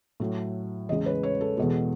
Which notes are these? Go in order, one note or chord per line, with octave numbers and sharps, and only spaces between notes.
A2 F#3 A3
E2 C#3 G#3 D#5
B4
C#5
A4
E2 B2 G#3